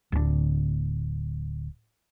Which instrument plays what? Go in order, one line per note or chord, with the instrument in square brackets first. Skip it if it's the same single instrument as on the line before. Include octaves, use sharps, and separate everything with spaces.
[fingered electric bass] D1 D2 G3 D4